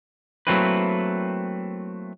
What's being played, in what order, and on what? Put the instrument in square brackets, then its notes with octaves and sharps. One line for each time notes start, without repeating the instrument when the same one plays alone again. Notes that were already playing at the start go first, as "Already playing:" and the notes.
[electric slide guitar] F#3 A3 A#3 C4 E4 B4